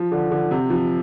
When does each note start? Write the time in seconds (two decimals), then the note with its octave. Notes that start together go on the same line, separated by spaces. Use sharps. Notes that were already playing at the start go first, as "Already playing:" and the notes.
Already playing: F3
0.12 D3
0.31 D3
0.51 C3
0.70 F3